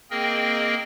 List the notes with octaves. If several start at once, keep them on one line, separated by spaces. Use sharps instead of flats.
A#3 C4 G#4 A#4 D#5 G5